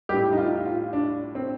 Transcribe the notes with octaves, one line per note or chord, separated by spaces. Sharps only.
A2 G3 G4
D#4
F4
F4
D4
C4